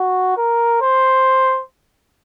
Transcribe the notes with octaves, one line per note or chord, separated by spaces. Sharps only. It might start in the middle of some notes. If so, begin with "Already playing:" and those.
Already playing: F#4
A#4
C5